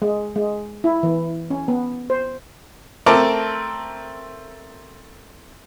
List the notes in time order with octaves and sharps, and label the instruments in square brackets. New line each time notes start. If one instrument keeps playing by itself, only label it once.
[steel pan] G#3
G#3
E4
E3
C#4
B3
C5
[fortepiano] A3 C4 A#4 A5 D6